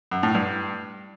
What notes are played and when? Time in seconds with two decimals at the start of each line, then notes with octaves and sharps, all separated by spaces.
0.11 F#2
0.23 A2
0.35 G2